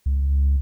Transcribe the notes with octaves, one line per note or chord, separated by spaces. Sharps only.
C#2